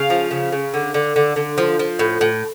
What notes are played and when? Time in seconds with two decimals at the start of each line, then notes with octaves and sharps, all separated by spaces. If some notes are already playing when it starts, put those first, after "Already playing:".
Already playing: C#3 F5
0.10 F3
0.31 C#3
0.52 C#3
0.74 D3
0.94 D3
1.16 D3
1.36 D3
1.58 F3
1.79 F3
1.99 A2
2.21 A2